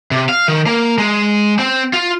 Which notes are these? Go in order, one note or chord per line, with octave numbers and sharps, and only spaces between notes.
C3
F5
D#3
A#3
G#3
C4
F4